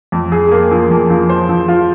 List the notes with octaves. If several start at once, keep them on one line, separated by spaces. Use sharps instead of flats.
F2
G#4
A#3
F3
F2
F3
C5
F3
F4